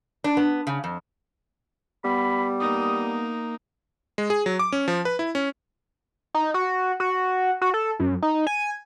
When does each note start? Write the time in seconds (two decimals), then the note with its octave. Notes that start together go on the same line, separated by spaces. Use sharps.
0.24 D4
0.37 B3
0.67 C#3
0.84 F2
2.04 G3 B3 B5
2.60 A#3 D#4 D#6
4.18 G#3
4.30 G#4
4.46 F#3
4.59 D6
4.72 C#4
4.88 F3
5.05 B4
5.19 E4
5.35 C#4
6.34 D#4
6.54 F#4
7.00 F#4
7.62 F#4
7.74 A4
8.00 F#2
8.23 D#4
8.47 G#5